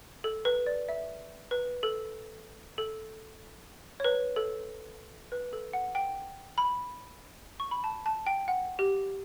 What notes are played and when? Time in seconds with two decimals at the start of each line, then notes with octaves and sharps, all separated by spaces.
0.24 A4
0.45 B4
0.66 D5
0.88 E5
1.51 B4
1.83 A4
2.78 A4
4.00 C#5
4.04 B4
4.36 A4
5.32 B4
5.53 A4
5.73 F#5
5.95 G5
6.58 B5
7.60 C#6
7.71 B5
7.84 A5
8.06 A5
8.26 G5
8.48 F#5
8.79 G4